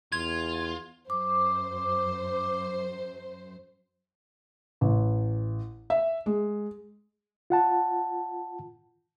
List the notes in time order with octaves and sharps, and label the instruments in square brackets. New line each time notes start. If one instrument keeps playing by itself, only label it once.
[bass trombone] E2 [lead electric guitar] F4 [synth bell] G#6
[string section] F#2 C5 [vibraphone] D6
[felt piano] A1
E5
G#3
[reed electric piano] F4 F#5 A5